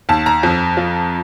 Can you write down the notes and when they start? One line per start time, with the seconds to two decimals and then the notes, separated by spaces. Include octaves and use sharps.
0.09 D#2 A5
0.26 A#5
0.43 F2
0.77 F3